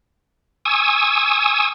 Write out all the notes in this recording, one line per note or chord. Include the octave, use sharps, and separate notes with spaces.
G#5 C#6 D#6 E6